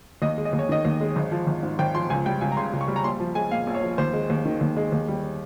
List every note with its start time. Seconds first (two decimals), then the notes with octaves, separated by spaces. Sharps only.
0.22 D#2 D#5
0.38 G#3
0.45 D#5
0.53 D#2
0.59 C#5
0.69 D#3 D#5
0.85 D#2
1.01 G#3
1.16 G#1
1.32 F3
1.47 G#1
1.63 G#2
1.79 G#1 G5
1.95 F3 C6
2.10 C#2 G#5
2.26 G3 G5
2.41 C#2 G#5
2.52 A#5
2.57 C#3 C6
2.73 C#2
2.81 C#6
2.88 G3
2.96 A#5
3.04 A#1 C6
3.20 F3
3.35 G#3 G#5
3.51 A#2 F5
3.67 A#1
3.75 C#5
3.83 F3
3.98 D#2 C5
4.13 G#3
4.30 D#2
4.45 D#3
4.61 D#2
4.77 G#3
4.92 D#2
5.08 G3